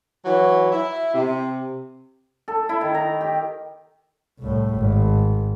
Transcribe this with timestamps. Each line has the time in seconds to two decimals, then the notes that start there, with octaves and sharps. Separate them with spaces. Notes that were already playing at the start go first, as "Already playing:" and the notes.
0.24 E3 F#3
0.71 E4
1.14 C3
2.48 A4
2.69 E4
2.81 D#3
2.94 A#5
3.21 G4
4.39 C2 A2
4.75 G#1